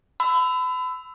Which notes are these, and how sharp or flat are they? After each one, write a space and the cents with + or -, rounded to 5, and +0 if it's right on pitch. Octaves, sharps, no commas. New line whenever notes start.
B5 +35 E6 +0